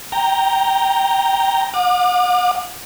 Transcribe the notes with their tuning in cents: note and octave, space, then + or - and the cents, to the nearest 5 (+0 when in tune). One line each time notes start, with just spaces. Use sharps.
G5 +0 A#5 +0
F#5 -40 D6 +40